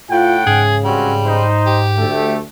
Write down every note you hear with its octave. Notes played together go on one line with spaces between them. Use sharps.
A2 F4 F#5 G5
G#2 C#3 G#4
G3 C4 C#4 F#4
D#4 C5
G4
D2 A3